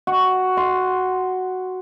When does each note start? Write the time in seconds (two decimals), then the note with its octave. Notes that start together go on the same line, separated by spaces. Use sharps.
0.07 F#4
0.57 C6